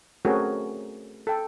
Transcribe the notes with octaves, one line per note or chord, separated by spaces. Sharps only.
A3 C4 C#4 F#4 G#4 A#4
A4 G5